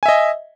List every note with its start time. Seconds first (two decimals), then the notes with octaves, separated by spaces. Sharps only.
0.03 G#5
0.06 E5
0.09 D#5